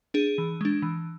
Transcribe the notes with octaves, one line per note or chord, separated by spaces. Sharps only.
D4 G#4
E3
G#3 D4
E3